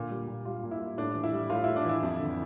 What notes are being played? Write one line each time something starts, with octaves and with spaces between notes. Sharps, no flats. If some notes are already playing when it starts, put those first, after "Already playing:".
Already playing: A#2 D3
G3
A#2
G3 F4
A#2
E4
G3
A2 D4
E3
E4
G3
A2 F4
A2 E4
D4
E3 E4
F2
D3